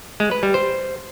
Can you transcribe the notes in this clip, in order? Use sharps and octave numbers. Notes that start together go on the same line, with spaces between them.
G#3
B4
G3
C5